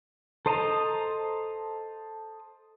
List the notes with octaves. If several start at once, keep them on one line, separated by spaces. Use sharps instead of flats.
A4 C5 D#5 A5 A#5